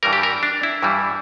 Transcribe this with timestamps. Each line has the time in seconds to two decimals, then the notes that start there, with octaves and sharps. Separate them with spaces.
0.03 G2 E3 G3 A#4
0.13 G4
0.23 A#4
0.43 D4
0.63 E4
0.83 G2 E3 G3